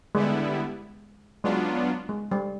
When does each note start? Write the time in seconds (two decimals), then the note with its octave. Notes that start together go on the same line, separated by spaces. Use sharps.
0.15 D3 G3 G#3 B3 E4
1.44 F#3 G#3 B3 D4 F4
2.09 G#3
2.31 G3